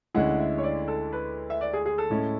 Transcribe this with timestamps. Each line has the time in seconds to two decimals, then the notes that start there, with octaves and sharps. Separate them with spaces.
0.14 D2 D3 G#3 C#4 E4 F#5
0.39 E5
0.58 C#5
0.63 D5
0.88 A4
1.13 B4
1.50 E5
1.61 D5
1.73 G#4
1.86 G#4
1.98 A4
2.10 A2 G#3 C#4 E4